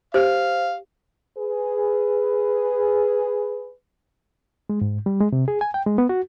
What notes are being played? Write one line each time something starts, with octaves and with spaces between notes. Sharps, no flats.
G4 C5 F5
G#4 B4
G#3
G#2
G3
G#3
C3
G#4
G#5
G5
G#3
B3
F#4